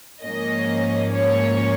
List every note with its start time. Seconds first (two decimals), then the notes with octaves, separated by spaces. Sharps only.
0.23 G#2 F3 A#3 C#4 D#5
1.12 C#5